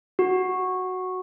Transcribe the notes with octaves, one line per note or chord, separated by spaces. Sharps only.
F#4